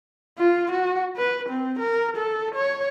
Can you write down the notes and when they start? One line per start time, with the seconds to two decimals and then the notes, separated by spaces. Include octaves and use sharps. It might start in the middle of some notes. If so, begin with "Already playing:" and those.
0.38 F4
0.72 F#4
1.17 B4
1.49 C4
1.79 A#4
2.17 A4
2.55 C#5